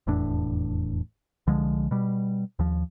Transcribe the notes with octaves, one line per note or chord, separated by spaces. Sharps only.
F1 E2 A2 D4
C2 D3 F3 G#3
B2 G3
D#2 F3